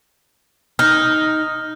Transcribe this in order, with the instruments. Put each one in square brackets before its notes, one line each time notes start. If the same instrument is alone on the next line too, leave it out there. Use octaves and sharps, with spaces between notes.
[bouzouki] D#4 [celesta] F6